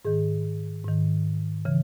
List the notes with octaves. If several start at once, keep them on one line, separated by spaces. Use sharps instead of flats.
G#2 D#3 G#4
G#2 D#3
C#3 E3